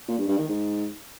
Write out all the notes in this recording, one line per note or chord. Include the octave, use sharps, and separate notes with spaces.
A#2
G2
G2
D#3
G#2